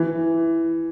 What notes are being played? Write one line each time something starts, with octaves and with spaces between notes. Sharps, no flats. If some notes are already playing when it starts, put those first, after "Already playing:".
Already playing: E3